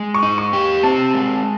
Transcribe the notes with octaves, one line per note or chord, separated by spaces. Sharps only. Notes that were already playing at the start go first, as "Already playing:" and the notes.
Already playing: G#3
C#6
D#4
C#6
G4
C4 A5
G#3